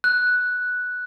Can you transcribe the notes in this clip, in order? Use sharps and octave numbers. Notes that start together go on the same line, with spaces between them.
F#6